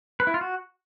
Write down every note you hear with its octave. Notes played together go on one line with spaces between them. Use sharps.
B4
E4
F4
F#4